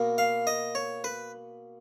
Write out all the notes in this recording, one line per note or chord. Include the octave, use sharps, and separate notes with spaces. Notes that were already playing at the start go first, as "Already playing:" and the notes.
Already playing: B2 A#3
F5
D#5
C#5
B4